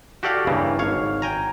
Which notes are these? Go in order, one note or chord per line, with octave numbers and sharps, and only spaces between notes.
F#4 G4 A4 D5 F5 F#5
G2 C#3 E3 A#3
G#1 C#5 F5
G5 G#5 A#5